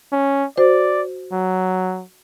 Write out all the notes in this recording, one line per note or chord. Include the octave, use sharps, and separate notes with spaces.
C#4
F#4 C5 D5
F#3